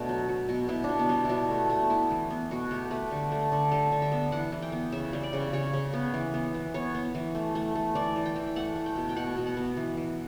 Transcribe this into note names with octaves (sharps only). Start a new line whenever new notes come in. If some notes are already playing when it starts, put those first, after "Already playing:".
Already playing: B2 A3 D4
F#3
F#3
B2
B2 E4
D4
B2
B3
G3
B2 D4 E4
A3
A3
B3 E4
E3
B3
B2 F#4
A3 G4
A3 B4
D3
A3
D3
G3 A4
D3
E5
B3
E3 F#5
E3
G5
B3
C#3 E5
G3
D5
C#3
C#3 C#5
C#3
B3
E3
B3
E3
B3 C#5
B3
E3
A3
A3
A3
E3 D5
E3
G5
E3
A3 F#5
A3
G5
B2
G5
B2 F#5
B2
F#5
B3
E3
E3